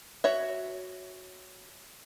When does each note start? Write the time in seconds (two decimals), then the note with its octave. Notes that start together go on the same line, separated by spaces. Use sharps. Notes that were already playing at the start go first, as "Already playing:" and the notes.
0.24 F#4 C#5 E5